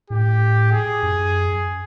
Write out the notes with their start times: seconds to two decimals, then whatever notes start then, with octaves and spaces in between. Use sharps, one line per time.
0.10 A2 G4
0.72 G#4
1.03 F#2